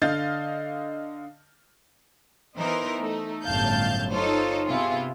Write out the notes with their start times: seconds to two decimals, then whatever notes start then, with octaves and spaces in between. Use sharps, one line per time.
0.01 D3 D#5 F5 F6 G6 A6
2.57 E3 B3 D#4 A#4 C5
3.01 A3 D#4
3.46 G1 F#2 A2 F5 A5 G6
4.12 D#4 F4 A4 C5 C#5
4.67 C3 B3 E4 F4 G#4